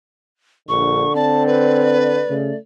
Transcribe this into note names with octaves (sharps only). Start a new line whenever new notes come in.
A#1 D3 C#6
C4 D5 A5
B4
C#3 A3